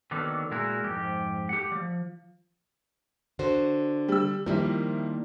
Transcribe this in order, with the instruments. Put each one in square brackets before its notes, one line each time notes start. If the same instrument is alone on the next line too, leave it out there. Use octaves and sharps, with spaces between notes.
[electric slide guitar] D3 D#3 F#3 A#3 B3
A#2 G#3 E4 F#4 A#4
F2 G#2 G4
G4 F#5
F3 G3
[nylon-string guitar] D3 F#4 C5
[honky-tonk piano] G3 E6
[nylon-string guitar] D#3 G3 A#3 [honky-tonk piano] F3 E4